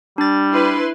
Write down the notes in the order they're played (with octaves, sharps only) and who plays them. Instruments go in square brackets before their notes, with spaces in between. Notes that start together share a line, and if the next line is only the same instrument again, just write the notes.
[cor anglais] G3 [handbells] D4 A6
[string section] E4 B4 C6